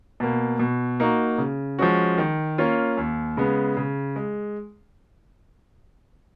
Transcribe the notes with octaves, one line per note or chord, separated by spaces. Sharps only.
B2 A#3
B2
A#3 D#4 F#4
C#3
F3 G#3 C#4 F#4
D#3
A#3 C#4 F4
D#2
C#3 G#3 B3
C#3
G#3